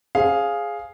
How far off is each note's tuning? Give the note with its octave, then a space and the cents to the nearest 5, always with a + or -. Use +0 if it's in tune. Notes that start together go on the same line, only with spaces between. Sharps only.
G#4 +0 C5 +20 F5 +0